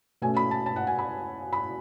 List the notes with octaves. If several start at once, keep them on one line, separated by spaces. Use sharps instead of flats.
B2 A3 C#4 G#5
B5
A5
A5
F#5
G#5
B5
B5